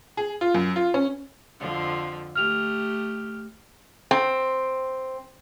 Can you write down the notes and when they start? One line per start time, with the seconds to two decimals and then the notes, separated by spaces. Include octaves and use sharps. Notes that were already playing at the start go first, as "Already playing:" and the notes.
0.17 G#4
0.41 F4
0.54 F#2
0.76 F4
0.94 C#4
1.60 F2 D3 F3
2.35 A3 G4 F6 F7
4.11 C4